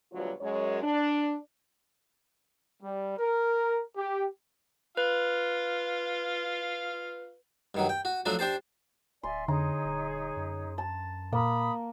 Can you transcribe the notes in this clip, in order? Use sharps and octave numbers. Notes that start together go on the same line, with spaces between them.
D2 B2 F#3 G3 F4 C#5
F#2 G#3 C#5
D4
G3
A#4
G4
F4 B4 F5
G2 D#3 F#3
G5
F#4
F3 F#3 A3 D4 F#4
D4 G4 C5 A5
D1 D5 E5 G#5 C6
F2 D3 D#4 G#4 C#5 A#5
D#1
F#2
A5
A#2 A#3 B5 D#6